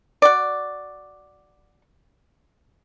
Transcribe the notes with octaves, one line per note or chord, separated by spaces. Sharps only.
F#4 D5